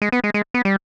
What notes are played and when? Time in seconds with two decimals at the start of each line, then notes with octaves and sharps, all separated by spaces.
0.02 G#3
0.12 B3
0.24 G#3
0.34 G#3
0.54 B3
0.65 G3